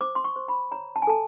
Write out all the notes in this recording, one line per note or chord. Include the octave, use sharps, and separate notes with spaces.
C5 D6
C6
C#6
C5
B5
C#5 A#5
A5
G#5
A4 A5